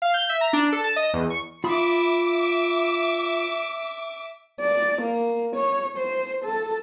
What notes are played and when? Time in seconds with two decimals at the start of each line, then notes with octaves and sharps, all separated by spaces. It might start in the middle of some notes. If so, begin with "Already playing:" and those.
0.02 F5
0.14 G6
0.29 E5
0.41 A#5
0.53 D4
0.72 A4
0.84 A5
0.96 D#5
1.13 E2
1.30 C#6
1.64 F4 E5 B5 D6 D#6
4.61 D5
5.02 A#3
5.56 C#5
5.97 C5
6.44 A4